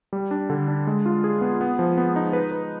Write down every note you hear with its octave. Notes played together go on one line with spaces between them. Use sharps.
G3
D4
D3
D4
G#3
F4
G#4
B3
B3
F3
B3
D#4
B4
B4